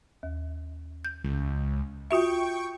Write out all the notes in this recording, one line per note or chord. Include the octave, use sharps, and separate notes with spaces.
D#2
G6
C#2
F4 F#4 E5 G5 C#6